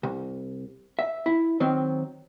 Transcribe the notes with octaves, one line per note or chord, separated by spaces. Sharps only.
C2
E5
E4
D#3 F#3 C4